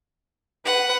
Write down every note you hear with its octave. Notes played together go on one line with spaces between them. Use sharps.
B4 F#5